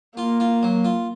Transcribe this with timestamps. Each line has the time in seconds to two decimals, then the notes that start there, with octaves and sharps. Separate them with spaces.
0.17 A#3 F4
0.40 F4
0.63 F#3
0.84 F4